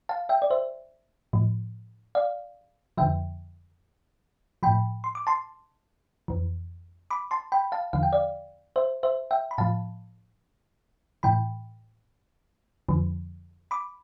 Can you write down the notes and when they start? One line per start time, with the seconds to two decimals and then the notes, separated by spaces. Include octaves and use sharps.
0.09 F5 A5
0.29 E5 G5
0.42 D5
0.51 C5 E5
1.33 A2 F3
2.15 D5 F5
2.97 F2 D3 F3 E5 G5
4.63 A2 F3 G5 B5
5.04 C6
5.15 D6
5.27 A5 C6
6.28 F2 E3
7.11 B5 D6
7.31 A5 C6
7.52 G5 B5
7.72 F5 A5
7.93 E2 D3 F3 F5
8.03 G5
8.13 D5 F5
8.76 C5 E5
9.03 C5 E5
9.31 E5 G5
9.51 B5
9.58 A2 F3 F5 A5
11.23 A2 E3 G5 B5
12.89 F2 D3 F3
13.71 B5 D6